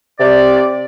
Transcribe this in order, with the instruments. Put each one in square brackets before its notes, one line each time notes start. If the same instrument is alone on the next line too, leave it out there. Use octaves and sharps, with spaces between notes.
[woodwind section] C3 D5